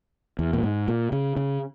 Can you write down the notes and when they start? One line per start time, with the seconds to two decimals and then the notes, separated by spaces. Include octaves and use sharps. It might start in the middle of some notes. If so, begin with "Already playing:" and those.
0.39 E2
0.53 A#2
0.63 G#2
0.88 A#2
1.12 C#3
1.37 C#3